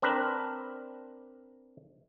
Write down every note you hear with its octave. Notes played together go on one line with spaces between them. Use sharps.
C4 D4 A#4 B4